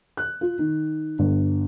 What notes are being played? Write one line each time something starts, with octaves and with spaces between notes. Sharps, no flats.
F#6
F4
D#3
G1